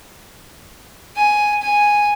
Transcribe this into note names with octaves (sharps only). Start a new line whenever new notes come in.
G#5
G#5